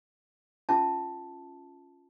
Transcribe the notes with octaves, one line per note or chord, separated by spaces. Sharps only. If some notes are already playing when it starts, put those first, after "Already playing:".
C#4 F4 E5 A5